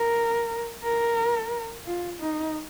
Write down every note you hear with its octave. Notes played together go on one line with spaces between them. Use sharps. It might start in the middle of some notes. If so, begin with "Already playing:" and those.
Already playing: A#4
A#4
F4
D#4